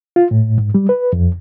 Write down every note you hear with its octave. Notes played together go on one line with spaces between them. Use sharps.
F4
A2
G#2
G3
B4
F2